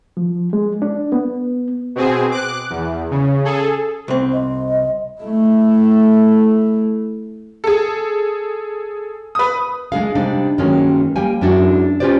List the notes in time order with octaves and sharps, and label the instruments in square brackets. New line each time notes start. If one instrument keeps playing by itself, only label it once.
[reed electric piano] F3
G#3
D4
B3
[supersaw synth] B2 C4 G#4
D6 F#6
E2
C#3
G#4 A4
[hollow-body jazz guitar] C2 C4
[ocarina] D#5
[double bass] A3 E4
[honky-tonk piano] G#4 A4
B4 D#6
[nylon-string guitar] G#3 D4 G#4 F5
C3 G3 D4 D#4
G2 D#3 F#3 G#3 A#3 C#4
G3 A#3 G5 G#5
F#2 G#3 D4 E4 F#4
C#4 F4 G4 B4 C5 D5